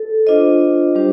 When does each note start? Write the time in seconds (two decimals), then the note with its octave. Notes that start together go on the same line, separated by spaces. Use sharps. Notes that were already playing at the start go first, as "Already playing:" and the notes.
Already playing: A4
0.27 D4 F4 C5 D#5
0.95 G3 D4 G4 C5